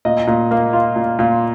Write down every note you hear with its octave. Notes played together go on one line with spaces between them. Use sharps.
A#2 D#5
A#2
A#3
F4
A#2
A#2